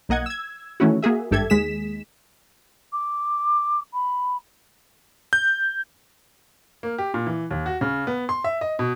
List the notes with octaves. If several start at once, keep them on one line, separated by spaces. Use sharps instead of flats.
B1 A#3 D#5 F#5 G#6
E6 G#6
D#3 E3 A3 C#4 E4 F#4
A#3 F#4 G#4 E5
G#1 G2 G4 A4 E5 G#6
D#2 G#3 G#4 B6 E7
D6
B5
G6
A#3
G4
A#2
E3
D#2
F#4
C#3
B3
C6
E5
D#5
B2